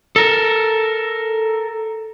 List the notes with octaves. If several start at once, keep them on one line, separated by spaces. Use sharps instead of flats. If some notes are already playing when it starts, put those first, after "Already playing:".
A4 A#4